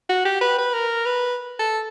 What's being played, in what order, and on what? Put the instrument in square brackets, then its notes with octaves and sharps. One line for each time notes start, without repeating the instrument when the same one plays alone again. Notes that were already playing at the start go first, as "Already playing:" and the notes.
[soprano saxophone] F#4
G4
B4
B4
A#4
B4
A4